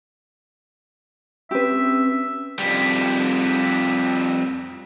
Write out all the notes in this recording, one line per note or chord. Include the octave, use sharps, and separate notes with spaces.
C4 C#4 G4 B4 E5 E6
F2 G3